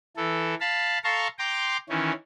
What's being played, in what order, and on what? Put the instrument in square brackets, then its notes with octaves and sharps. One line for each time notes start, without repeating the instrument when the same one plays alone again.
[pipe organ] E3 A4
F5 A5 B5
A4 F5 A5 A#5 C6 C#6
G5 A#5 C6 D6
D#3 E3 C#4